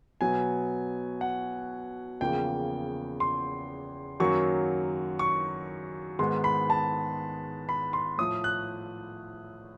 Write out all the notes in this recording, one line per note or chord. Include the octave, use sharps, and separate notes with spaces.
B2 F#3 B3 G#5
F#5
E2 C#3 F3 A#3 G5
C6
F#2 D#3 F#3 A#3 C#6
C#6
G#2 D#3 G#3 B3 C6
B5
A5
B5
C6
A2 F3 A3 D#6
F#6